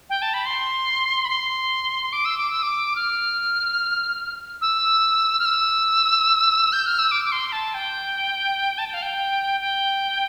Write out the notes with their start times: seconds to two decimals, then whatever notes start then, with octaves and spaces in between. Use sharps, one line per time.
0.10 G5
0.22 A5
0.34 B5
0.45 C6
1.25 B5
1.29 C6
2.12 D6
2.25 E6
2.37 D6
2.50 E6
2.63 D6
2.96 F6
4.61 E6
5.39 F6
5.45 E6
6.72 G6
6.86 F6
6.99 E6
7.11 D6
7.25 D6
7.32 C6
7.52 A5
7.74 G5
8.78 A5
8.85 G5
8.94 F5
9.02 G5
9.61 G5